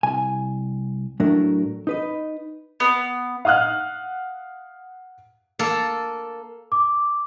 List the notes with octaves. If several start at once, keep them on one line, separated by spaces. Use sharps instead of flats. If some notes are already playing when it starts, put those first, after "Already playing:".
C2 G#5
A2 F#3 A3 D4 A#4
D#4 B4 D#5
B3
F5 F#5 D#6 F6 F#6
A#3 A4
D6